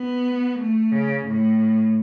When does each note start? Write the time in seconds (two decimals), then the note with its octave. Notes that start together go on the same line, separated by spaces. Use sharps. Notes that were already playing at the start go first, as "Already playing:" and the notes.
Already playing: B3
0.58 A3
0.92 C#3
1.26 A2